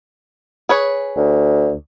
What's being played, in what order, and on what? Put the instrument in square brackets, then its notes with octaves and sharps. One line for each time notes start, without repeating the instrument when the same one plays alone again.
[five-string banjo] G#4 B4 C#5
[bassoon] D2